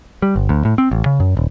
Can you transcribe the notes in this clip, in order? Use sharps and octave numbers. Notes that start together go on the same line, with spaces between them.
G3
G1
D2
A2
C4
A1
C#3
F#2
D#1